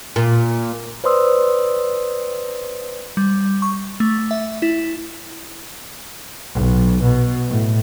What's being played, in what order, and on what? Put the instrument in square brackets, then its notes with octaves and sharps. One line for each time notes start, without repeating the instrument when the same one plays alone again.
[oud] A#2
[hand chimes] B4 C5 D5 C6 D#6 E6
[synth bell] G3
C#6
A3
E5
E4
[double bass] B1
B2
A2